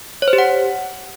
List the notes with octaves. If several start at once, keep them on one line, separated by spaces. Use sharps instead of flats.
C#5
C5
G4
F#5